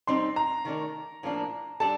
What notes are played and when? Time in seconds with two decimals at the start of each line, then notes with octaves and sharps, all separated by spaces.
0.07 G3 C4 D#4 C6
0.36 A#5
0.65 D#3 A3 D#4 A#4 D5
1.23 A2 F3 A#3 D4
1.80 G3 D4 A4 A5